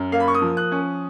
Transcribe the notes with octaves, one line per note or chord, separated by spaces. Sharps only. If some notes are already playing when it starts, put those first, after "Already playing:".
Already playing: F#2
A#3 F5
B5
C#6
D#6
F3
F#6
C#4